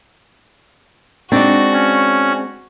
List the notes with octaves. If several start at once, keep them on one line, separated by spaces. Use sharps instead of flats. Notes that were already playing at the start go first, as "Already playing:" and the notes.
G#3 C4 D4 D#4 F#4
C#4